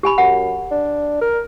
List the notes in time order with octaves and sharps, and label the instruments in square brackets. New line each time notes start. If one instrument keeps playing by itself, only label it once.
[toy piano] G4 G#5 B5
[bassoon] F#2 [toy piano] F#5
[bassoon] D4
A#4